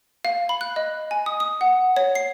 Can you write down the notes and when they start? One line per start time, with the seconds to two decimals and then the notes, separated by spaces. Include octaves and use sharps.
0.25 F5
0.49 B5
0.61 F#6
0.76 D#5
1.11 G#5
1.26 D#6
1.40 D#6
1.61 F#5
1.96 C#5
2.15 C7